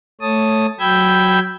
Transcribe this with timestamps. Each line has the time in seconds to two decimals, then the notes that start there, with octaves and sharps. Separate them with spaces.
0.21 A3 C#5 A5 D#6
0.80 F#3 G5 B5 E6 G6 G#6